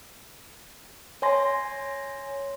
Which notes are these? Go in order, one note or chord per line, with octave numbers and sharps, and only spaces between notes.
C#5 G#5 C6 A#6